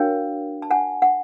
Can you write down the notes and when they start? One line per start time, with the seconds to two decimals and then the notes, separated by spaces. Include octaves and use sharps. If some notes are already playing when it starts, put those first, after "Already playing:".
Already playing: D4 F#4 A#4 C#5 F5 G5
0.62 A5
0.70 F#5 G#5
1.02 F#5